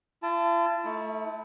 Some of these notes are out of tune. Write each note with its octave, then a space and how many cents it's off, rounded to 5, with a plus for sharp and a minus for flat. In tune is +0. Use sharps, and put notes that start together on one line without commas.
F4 -45 A5 +0
A3 +0 E4 -40